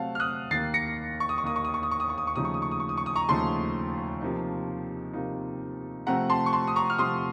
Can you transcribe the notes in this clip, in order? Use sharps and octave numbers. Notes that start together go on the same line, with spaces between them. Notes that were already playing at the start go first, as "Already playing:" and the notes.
Already playing: C3 F#3 A3 C4 F5 F#5 A5
F6
D#6 F#6
D#2 D#3 A#3 A6 C7
A#6 C#7
C#6
D#6
C#6
D#2 D#3 A#3 D#6
C#6
D#6
C#6
D#6
C#6
D#6
C#6
D#6
C#6
D#2 C#3 F3 A3 D#4 D#6
C#6
D#6
C#6
D#6
C#6
D#6
C#6
D#6
A#5 C#6
D#2 C#3 F3 A3 D#4 A5 C6
C3 F3 A#3 D#4
C3 F3 A#3 D#4
C3 F3 A3 C4 F#5 A#5
A5 C6
C#6
A5 C6
D#6
A#5 C#6
F6
C3 F3 A3 C4 C6 D#6